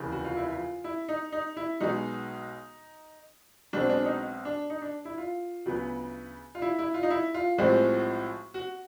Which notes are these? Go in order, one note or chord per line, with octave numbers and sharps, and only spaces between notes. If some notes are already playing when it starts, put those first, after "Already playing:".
Already playing: F1 D#2 C#3 E3
F#4
F4
E4
F4
E4
D#4
D#4
E4
B1 B2 G#3 D#4
B1 B2 G#3 C4 D4
D4
D#4
D4
D#4
D4
E4
F4
D2 C#3 F#3 B3
F4
E4
E4
F4
D#4
E4
F4
B1 A2 F3 G#3 C4 G4
F#4